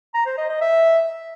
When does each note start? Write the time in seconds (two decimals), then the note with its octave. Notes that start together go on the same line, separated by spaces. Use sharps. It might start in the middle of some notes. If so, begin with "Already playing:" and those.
0.14 A#5
0.26 C5
0.38 D#5
0.50 D#5
0.61 E5